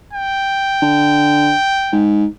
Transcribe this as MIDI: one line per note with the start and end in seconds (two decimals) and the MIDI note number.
0.13 2.05 79
0.82 1.53 50
1.92 2.25 44